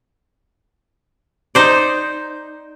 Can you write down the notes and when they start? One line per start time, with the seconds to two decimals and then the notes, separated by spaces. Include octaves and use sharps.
1.55 D#4 C5 D5